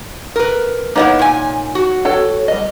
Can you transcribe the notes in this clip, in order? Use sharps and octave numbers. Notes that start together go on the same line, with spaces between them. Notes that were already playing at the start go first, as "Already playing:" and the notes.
A#4 B4
A#3 B3 D#4 E4 C#5 D#5
A#2 G#5
F#4
A4 C#5 G5
G3 D#5